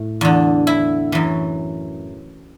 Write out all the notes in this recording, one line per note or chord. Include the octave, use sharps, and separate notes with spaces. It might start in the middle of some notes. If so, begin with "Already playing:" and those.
Already playing: A2
E2 D3
E4
F#2 E3